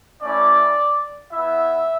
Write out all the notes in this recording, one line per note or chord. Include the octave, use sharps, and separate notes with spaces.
A3 C#4 E4 D5
B3 E4 E5